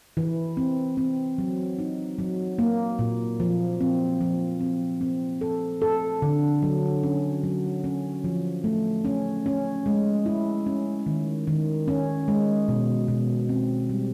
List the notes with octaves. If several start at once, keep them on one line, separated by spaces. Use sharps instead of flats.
E3
C4
C4
F#3
D#4
F#3
A#3
A#2
F3
C4
F3
C4
C4
A4
A4
D3
F#3
C#4
F#3
C#4
F3
A3
C#4
C#4
G#3
E4
C#4
D#3
D#3
C#4
G#3
B2
B2
C4
G3